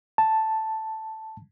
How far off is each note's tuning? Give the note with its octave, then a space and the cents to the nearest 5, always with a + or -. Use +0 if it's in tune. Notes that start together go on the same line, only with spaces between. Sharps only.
A5 +0